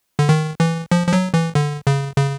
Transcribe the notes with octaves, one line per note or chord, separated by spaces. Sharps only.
D3
D#3
E3
F3
F3
F#3
E3
D3
C#3
C#3